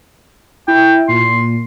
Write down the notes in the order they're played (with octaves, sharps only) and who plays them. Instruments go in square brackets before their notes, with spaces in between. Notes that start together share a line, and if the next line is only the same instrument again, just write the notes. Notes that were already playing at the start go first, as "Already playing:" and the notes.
[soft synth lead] E4 [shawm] G5
[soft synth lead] A#2 [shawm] C6